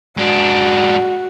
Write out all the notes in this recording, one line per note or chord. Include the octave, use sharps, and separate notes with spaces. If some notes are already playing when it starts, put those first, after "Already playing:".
G#2 D4 F#4